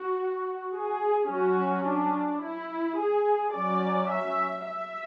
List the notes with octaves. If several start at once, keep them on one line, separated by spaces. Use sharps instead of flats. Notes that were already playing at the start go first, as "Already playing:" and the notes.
Already playing: F#4
G#4
F#3 C#4 F#4
D4
E4
G#4
F#3 C#4 D5
E5
E5